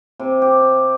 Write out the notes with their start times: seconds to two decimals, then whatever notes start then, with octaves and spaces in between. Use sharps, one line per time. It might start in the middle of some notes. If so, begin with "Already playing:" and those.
0.20 C3
0.42 G4